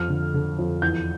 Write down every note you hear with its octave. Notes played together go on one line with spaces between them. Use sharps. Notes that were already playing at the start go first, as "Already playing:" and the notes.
Already playing: F2 F6
D3
D3
F2
E2 G6